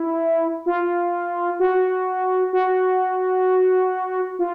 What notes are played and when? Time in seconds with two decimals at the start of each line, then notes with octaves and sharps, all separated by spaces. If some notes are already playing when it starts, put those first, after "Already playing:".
Already playing: E4
0.66 F4
1.59 F#4
2.53 F#4
4.39 F4